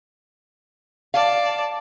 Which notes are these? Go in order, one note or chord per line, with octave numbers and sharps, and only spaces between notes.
D5 F5 A5